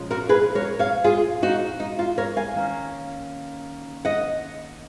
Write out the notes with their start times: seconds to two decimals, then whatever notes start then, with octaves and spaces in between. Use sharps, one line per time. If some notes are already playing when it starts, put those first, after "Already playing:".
Already playing: A#2 F3 G#3 C#4
0.11 F#4 A#4
0.29 G#4 B4
0.55 A#4 C#5
0.79 C#5 F5
1.04 F4 G#4
1.43 D#4 F#4
1.80 D#4
1.99 F4
2.18 A#4 C#5
2.36 F5 G#5
2.55 D#3 A#3 C#4
4.05 D#5 F#5